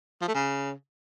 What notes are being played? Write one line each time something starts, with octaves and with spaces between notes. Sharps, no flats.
F3
A3
C#3